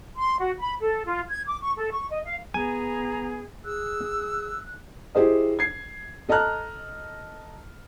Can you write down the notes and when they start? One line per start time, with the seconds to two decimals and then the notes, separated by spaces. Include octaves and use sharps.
0.16 C6
0.39 F#4
0.58 B5
0.80 A4
1.05 F4
1.29 G#6
1.46 D6
1.61 C#6
1.77 A4
1.92 C#6
2.10 D#5
2.25 F5
2.54 B3 G#4 G#5 A#5
3.65 G#4 E6 F#6
5.15 E4 G4 G#4 C5 D#5
5.59 G#6 C7
6.29 A4 D#5 A5 A#5 F6 F#6